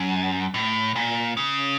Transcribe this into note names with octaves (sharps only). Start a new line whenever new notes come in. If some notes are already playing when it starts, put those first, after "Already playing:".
Already playing: F#2
A2
A#2
C#3